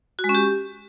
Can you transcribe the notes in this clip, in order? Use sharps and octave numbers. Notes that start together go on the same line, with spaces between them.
F#4
G#3
C#4
G4